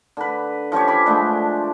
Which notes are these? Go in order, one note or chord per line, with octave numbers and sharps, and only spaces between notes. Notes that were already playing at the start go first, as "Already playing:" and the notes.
D3 B4
F3 C#4 G4 C#5
G#5 B5 D6
D3 G#3 A3 D4